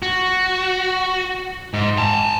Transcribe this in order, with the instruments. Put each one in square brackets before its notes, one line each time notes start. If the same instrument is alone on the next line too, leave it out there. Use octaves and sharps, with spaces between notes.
[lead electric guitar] F#4
G#2
A5 A#5